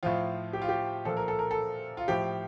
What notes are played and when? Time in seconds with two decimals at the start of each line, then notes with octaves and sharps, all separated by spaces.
0.03 A2 F3 F4
0.53 G4
0.62 F4
0.69 G4
1.05 A#2 F3 A4
1.17 A#4
1.28 A4
1.39 A#4
1.51 A4
1.97 F4
2.08 A2 F3 G4